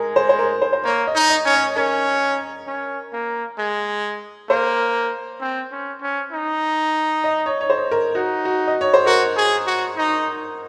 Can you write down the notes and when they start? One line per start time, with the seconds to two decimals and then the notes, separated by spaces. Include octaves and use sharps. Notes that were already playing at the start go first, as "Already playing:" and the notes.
Already playing: G#3 G#4 A#4
0.16 C5
0.29 C5
0.39 A#4
0.62 C5
0.73 C5
0.84 A#3 C#5
1.07 D#5
1.15 D#4
1.30 D#5
1.45 C#4
1.53 C#5
1.76 C#4 A#4
2.67 C#4
3.13 A#3
3.58 G#3
4.50 A#3 C5
5.41 C4
5.72 C#4
6.02 C#4
6.32 D#4
7.24 D#5
7.46 C#5
7.61 C#5
7.70 C5
7.91 A#4
8.15 D#4 F#4
8.45 F#4
8.67 D#5
8.81 C#5
8.94 C5
9.06 F#4 A#4
9.36 G#4
9.67 F#4
9.97 D#4